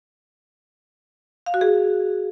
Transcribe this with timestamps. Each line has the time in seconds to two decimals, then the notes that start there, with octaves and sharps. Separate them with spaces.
1.46 F5
1.54 F#4
1.61 G#4